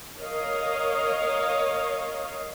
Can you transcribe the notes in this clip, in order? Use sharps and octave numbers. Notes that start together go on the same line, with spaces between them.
A#4 C#5 D#5 F5